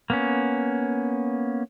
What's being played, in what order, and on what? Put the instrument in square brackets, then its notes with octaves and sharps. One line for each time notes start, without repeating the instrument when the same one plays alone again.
[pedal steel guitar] A#3 B3 C#4